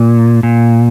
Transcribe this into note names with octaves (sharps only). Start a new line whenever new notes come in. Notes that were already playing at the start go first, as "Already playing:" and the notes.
Already playing: A#2
A#2